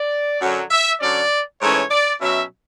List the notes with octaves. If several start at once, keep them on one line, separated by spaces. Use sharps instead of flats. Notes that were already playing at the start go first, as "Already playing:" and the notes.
Already playing: D5
F#2 D3 F#3
E5
D3 F#3 C#4 D5
G#2 E3 A3 C#4 C#5
D5
B2 F#3 C#4 E5